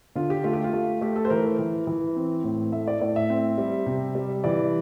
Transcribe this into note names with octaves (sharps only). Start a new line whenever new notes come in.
D3 F4
G4
A3 F4
G4
F4
A3
A3 G4
A4
C5
E3 A#4
E3
E3
C4
A2
A3 E5
D5
A2 D5
E5
C4
G3
C3
G3
E3 D5